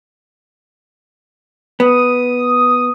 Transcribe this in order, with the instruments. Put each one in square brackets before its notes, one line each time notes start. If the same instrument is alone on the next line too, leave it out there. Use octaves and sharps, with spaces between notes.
[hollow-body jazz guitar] B3 [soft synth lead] D#6